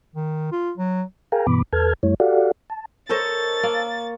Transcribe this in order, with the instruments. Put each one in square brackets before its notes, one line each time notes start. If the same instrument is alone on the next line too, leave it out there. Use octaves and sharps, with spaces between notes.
[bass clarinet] D#3
F4
F#3
[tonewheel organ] G#4 A#4 F5 G5 G#5 A#5
G2 B2 E3 B3 B5 D6
E2 A4 B4 A5 F6 G#6
F#2 G3 A3 E4 C#5
F#4 G4 A4 D5 F5 F#5
A5
[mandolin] A4 C5 D#5 [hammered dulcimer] A#4 C#5 [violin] A6
[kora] A#3